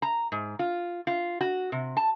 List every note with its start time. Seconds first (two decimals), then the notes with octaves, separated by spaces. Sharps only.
0.02 A#5
0.32 G#2
0.59 F4
1.07 F4
1.41 F#4
1.72 C3
1.97 A5